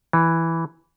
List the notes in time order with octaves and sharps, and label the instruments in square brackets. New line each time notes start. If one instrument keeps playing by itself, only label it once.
[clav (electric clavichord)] E3